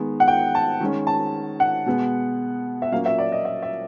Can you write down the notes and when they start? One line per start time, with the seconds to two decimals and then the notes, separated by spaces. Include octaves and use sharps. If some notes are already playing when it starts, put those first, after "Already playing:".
Already playing: D#3 G#3 B3
0.20 F#5
0.28 G5
0.55 A5
0.80 D#3 G#3 C#4
1.07 A5
1.60 F#5
1.86 B2 G#3 B3
2.82 E5
2.92 A#2 F#3 A#3 C#4 F5
3.06 E5
3.18 D5
3.32 D#5
3.45 E5
3.63 E5